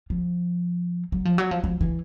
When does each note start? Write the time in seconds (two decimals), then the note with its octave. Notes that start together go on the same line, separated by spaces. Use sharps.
0.10 F3
1.12 F#3
1.25 F3
1.38 F#3
1.51 F3
1.64 F3
1.81 E3